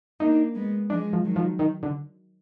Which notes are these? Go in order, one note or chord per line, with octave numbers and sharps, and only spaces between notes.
A#3 D4 D#4
G#3 B3
F3 G#3 D4
F3
D#3 F#3
F3
D#3
D3